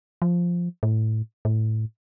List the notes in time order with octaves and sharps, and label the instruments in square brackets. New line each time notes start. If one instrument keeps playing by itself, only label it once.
[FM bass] F3
A2
A2